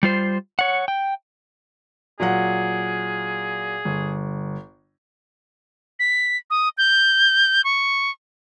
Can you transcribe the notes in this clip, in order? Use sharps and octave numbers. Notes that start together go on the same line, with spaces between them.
G3 F4 C5
C#5 F#5
G5
A#2 F#3 G#4 F#5
G1
B6
D#6
G6
C#6